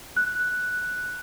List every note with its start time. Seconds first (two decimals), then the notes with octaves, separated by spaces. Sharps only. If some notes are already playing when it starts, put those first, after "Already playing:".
0.17 F#6